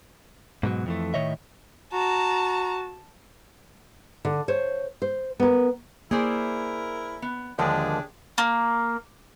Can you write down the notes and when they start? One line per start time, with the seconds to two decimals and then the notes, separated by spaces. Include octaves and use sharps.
0.63 G#2 B2 F#3
0.86 F2 E3 A3
1.14 A2 D#3 E3 C#5 D#5 E5
1.93 F#4 A5 A#5
4.25 D3
4.48 C5 C#5
5.02 C5
5.40 B3 A#4
6.11 A#3 E4 G#4 A#4 C5 D5
7.22 B3
7.59 D#2 D3 F3 G#3 D4 G4 G#4
8.38 A#3